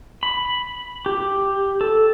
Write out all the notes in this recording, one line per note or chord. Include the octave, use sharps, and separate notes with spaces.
B5
G4
A4